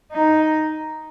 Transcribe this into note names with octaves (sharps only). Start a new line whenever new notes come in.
D#4